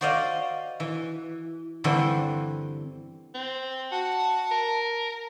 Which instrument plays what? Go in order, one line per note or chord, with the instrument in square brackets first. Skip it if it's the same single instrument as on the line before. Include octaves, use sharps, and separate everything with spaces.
[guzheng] F#4 C5 D5 D#5 F5
E3
G2 D3 E3 C4
[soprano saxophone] C4
[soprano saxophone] F#4 [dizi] A5
[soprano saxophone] A#4